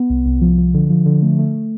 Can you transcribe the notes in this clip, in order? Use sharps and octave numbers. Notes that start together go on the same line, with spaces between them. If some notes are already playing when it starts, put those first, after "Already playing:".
Already playing: B3
C2
C2
F3
F3
D3
F3
D3
A3
A3